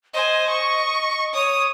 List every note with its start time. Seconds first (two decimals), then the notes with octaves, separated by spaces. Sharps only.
0.14 C5 D#5 G#5
0.50 C#6
1.34 C#5 D#6